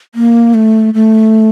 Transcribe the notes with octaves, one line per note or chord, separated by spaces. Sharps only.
A#3
A3
A3